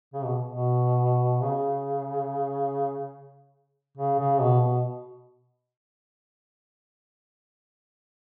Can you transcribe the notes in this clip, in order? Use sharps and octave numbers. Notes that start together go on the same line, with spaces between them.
C#3
B2
B2
C#3
C#3
C#3
B2
B2